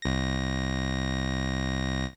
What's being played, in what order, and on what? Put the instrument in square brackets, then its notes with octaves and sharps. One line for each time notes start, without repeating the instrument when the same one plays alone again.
[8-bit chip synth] C2 A#6